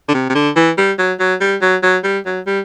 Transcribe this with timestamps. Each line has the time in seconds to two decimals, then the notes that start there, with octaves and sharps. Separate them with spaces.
0.09 D3
0.14 C3
0.30 C3
0.35 D3
0.56 E3
0.77 G3
0.98 F#3
1.20 F#3
1.41 G3
1.61 F#3
1.83 F#3
2.04 G3
2.26 F#3
2.46 G3